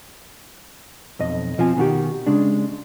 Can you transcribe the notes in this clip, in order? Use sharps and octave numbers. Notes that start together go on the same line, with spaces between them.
B1 F2 D#5
B2 F3 C4 G#5
B2 D#3 F#4 G4
C#3 G#3 D4